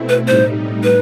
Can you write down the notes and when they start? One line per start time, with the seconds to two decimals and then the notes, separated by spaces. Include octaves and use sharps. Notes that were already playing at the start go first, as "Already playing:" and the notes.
Already playing: B2 A3 C4 E4
0.09 B4
0.27 A2 G3 D#4 C5
0.84 B4